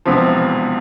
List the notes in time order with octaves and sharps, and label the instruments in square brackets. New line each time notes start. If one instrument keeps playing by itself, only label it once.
[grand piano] E1 E2 C3 F3